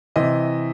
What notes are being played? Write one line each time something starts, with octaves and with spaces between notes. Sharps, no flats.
C3 E3 D#5